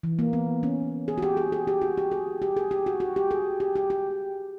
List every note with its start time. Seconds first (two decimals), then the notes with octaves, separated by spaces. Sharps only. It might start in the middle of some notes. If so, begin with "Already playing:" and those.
0.03 E3
0.19 A#3
0.33 B3
0.63 C#4
1.08 G#4
1.18 F#4
1.22 G4
1.37 G#4
1.52 G#4
1.67 G4
1.81 F#4
1.98 G4
2.12 G#4
2.42 G4
2.57 G#4
2.71 G4
2.86 F#4
3.00 F#4
3.16 G4
3.31 G#4
3.60 G4
3.76 G4
3.90 G4